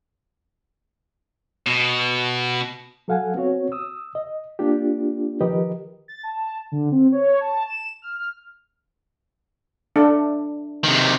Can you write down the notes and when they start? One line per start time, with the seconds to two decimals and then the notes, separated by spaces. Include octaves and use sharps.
1.67 B2
3.08 F#3 A4 F5 F#5 G#5
3.34 B3 C4 F#4 C#5
3.72 D#6 E6
4.15 D#5
4.59 A#3 D4 F4 G4
5.41 D#3 F3 G4 A#4 B4 D#5
6.08 A6
6.23 A5
6.72 D3
6.92 C4
7.12 C#5
7.41 A5
7.68 E7
8.02 F6
9.96 D4 A4
10.84 C3 D#3